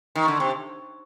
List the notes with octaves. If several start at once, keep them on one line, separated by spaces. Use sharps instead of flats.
D#3
D3
C3